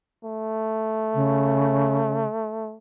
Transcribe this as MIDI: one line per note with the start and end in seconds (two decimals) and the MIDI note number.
0.24 2.77 57
1.14 2.25 49